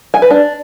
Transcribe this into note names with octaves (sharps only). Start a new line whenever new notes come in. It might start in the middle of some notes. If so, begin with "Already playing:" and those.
G#5
B4
D4